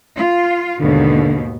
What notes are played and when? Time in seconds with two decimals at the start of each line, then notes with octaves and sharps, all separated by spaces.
0.15 F4
0.80 D#2 G#2 B2 D3